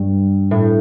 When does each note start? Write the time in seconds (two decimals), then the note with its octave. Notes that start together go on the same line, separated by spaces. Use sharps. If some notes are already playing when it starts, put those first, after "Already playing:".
Already playing: G2
0.51 A2